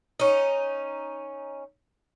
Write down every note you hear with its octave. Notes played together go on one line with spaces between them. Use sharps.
C#4 D#4